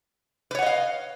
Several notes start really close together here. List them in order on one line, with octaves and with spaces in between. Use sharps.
B4 C#5 F#5 D#5 F5